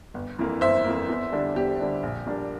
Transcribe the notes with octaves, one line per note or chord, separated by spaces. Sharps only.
G1
F2 E3 A#3
G1 C5 E5
F2 E3 A#3
E2
D3 G3 D4
E2 G4
D3 G3 D4
A#1
A#2 G3 A#3 D4